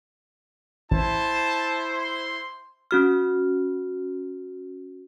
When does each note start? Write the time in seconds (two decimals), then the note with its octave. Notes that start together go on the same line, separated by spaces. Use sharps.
0.91 A1 E4 C5 A5
1.94 C6
2.91 C#4 F#4 F6